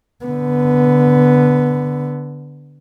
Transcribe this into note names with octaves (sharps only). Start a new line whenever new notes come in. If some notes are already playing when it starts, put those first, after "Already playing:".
D3 B3